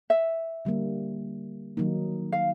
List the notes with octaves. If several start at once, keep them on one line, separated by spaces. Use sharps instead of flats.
E5
D3 G3 A#3
D#3 F#3 A#3 D#4
F5